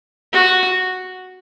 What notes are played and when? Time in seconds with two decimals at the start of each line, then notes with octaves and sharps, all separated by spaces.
0.33 F#4